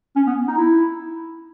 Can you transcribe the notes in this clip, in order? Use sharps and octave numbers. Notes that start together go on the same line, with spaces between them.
C#4
B3
D#4
E4